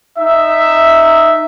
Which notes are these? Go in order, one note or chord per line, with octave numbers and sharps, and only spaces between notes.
D#4 E5